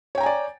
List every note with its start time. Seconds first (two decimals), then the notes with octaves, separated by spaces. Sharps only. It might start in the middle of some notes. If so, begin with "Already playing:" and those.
0.15 C#5
0.18 G5
0.20 A#5
0.23 G#5
0.26 D5